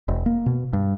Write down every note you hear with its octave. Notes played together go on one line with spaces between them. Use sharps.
E1
A#3
B2
G2